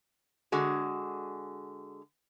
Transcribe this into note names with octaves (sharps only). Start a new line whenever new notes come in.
D3 G#3 F#4 G#4